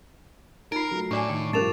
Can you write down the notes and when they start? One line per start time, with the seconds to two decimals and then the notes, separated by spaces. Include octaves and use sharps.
0.72 D#4 F4 A#4 C7 D7
0.91 F#3 A3
1.11 A2 D4 D5 G#5 C#6 D6 C7
1.29 D#3 G5
1.53 G2 F3 C#4 A#4 A5 A6 E7 F7